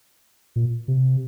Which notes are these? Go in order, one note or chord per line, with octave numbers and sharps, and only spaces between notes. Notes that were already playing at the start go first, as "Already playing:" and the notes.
A#2
C3